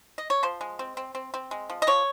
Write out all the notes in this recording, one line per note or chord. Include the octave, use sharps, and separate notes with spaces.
D#5
C#5
F3 C5
G#3
C4
C4
C4
C4
G#3
F3
D#5
F3 C#5